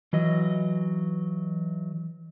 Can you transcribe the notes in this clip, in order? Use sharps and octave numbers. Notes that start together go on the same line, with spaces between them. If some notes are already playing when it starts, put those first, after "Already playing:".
E3 F#3 D#5